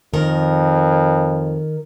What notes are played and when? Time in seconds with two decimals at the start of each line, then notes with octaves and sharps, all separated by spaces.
0.14 F2 D#3 A#4